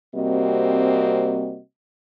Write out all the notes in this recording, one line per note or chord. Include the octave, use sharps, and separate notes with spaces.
C3 G3 A#3 C4 F#4 D#5